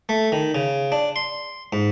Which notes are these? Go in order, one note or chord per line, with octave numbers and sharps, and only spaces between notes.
A3
D#3
C#3
D4
C6
G#2